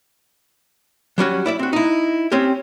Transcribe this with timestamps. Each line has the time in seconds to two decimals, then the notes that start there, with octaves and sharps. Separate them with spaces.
1.18 F#3 G3 C#4 F#4
1.46 E4 D5 E5
1.59 C4 F#4
1.73 D#4 E4
2.32 C4 C#4 G4